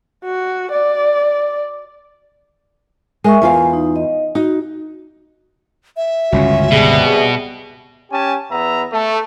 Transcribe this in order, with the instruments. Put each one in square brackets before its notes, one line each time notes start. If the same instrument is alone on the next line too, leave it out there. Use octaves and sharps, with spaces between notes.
[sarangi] F#4
D5
[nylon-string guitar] G#3 [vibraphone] A#4 E5 C#6
[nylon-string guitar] E2 F4 F5 [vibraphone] G#5
[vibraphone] D#4
D#5
[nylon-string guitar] D#4 [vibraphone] F#4
[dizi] E5
[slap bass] G1 C#2 C#3 [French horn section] C#4 F4 F#4
[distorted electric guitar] B2 [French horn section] G3 C4 G#4
[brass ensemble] C#4 G4 G#5 A5
E2 B3 E5 A#5
A3